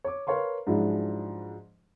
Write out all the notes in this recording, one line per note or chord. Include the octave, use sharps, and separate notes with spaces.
C#5 D6
A#4 B4 C#5 F5 C6 C#6
G#2 F3 F#3 G#3 D4 E4